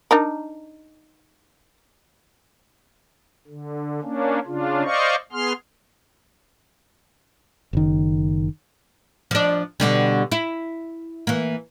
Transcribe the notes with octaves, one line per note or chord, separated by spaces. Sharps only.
D4 D#4 A#4
D3
A#3 C#4 D4
C#3 D4 F4
C5 D5 D#5 F5 C#6
B3 G#4 C6 F6
F#1 D#3
F3 D4
B2 D3 G3
E4
E3 A#3